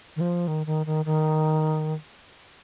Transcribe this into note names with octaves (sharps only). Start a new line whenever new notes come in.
D#3
F3
D#3
D#3
D#3
D#3